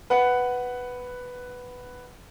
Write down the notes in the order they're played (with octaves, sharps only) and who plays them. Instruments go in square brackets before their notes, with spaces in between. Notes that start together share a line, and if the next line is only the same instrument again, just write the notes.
[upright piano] B4 F#5